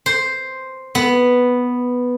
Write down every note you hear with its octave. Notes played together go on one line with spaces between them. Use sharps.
C5
B3